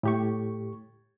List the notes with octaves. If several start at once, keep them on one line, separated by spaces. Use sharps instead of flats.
A2 G4 C#6